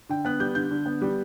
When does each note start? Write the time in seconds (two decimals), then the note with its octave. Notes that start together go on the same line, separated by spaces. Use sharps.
0.09 D3 G5
0.25 B3 F#6
0.40 G3 G6
0.55 D3 G6
0.71 D3
0.86 B3
1.02 G3